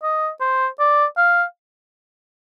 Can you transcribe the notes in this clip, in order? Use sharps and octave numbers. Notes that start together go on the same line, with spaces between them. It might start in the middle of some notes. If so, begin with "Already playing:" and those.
D#5
C5
D5
F5